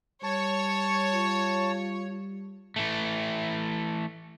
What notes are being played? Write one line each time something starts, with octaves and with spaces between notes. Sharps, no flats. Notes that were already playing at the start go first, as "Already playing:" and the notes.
G3 C#5 A5 C#6
F4
E3 A3